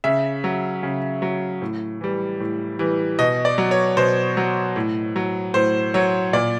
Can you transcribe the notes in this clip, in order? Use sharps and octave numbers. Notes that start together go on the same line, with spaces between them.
C#3 E5
F#3
C#3
F#3
A2
E3 G3
A2
E3 G3
B2 D#5
D5
F#3
C#5
B2 C5
F#3
A2
F#3
A2 C5
F#3 C#5
A#2 D5